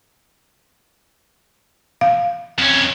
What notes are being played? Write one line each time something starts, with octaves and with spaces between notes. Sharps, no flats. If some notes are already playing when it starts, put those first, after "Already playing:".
F5
F2 C#4